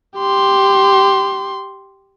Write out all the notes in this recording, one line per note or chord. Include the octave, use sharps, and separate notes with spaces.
G4 C6